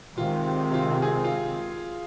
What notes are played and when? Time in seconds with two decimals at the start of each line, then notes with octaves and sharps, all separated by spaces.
0.17 C3 D#3 G#3 C4 F4
0.74 F4
1.02 G#4
1.24 F4